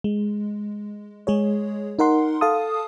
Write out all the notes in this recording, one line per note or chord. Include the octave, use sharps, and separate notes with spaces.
G#3
G#3 G#4 C#5
D#4 A#4 F#5 C6
A4 F5 A5 D#6